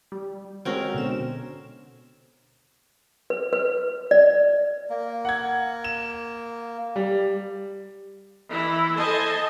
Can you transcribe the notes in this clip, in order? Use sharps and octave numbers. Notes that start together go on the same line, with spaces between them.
G3
G#3 C4 C#4 F#4 A#4 G5
B2 D3 E7
B4
B4
D5
A#3
F#5 G#6
E7
G3
E3 E4
A4 C5 D#5 G#5 A5